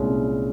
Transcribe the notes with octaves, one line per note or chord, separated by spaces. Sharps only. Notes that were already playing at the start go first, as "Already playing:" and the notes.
Already playing: C2 A#2 G#3 C#4